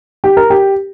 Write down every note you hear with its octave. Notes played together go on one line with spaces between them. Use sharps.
G4
A#4
G4